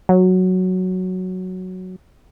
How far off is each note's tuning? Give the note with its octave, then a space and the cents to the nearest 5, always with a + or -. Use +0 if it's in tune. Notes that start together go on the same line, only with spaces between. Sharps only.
F#3 +0